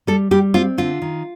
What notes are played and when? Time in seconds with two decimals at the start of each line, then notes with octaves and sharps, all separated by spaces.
0.07 G3 A4
0.31 G3 G4
0.54 C4 F4
0.78 D3 F4
1.02 D#3